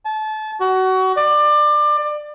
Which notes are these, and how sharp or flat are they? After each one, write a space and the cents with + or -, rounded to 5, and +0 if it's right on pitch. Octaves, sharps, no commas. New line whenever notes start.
A5 -30
F#4 +25
D5 +25